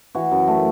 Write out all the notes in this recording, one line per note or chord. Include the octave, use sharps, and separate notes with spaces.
E3 F#4
F#2
A3